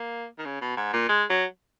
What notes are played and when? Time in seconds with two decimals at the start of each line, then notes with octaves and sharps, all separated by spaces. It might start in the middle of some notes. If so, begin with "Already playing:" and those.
Already playing: A#3
0.38 D#3
0.45 C#3
0.61 B2
0.77 G#2
0.93 A#2
1.09 G#3
1.30 F#3